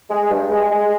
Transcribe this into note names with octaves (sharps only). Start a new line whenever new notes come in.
G#3
G2
G#3
G#3